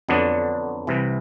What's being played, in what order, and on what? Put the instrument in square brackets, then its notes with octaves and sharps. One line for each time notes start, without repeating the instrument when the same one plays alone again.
[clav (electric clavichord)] F2 D3 F#3 B3 D4
C2 C3 E3